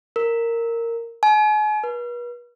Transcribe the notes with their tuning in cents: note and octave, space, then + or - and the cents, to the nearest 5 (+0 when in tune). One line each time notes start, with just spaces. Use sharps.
A#4 -15
G#5 +40
B4 -40